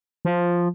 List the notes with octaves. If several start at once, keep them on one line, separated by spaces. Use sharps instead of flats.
F3